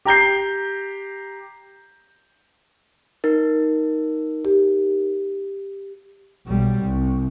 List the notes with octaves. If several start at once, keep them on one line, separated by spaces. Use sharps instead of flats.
G4 A#5 G6 C7
D#4 A#4
G4
B1 G3
C2